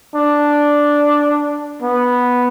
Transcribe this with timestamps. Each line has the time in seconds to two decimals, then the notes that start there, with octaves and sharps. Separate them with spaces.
0.15 D4
1.82 B3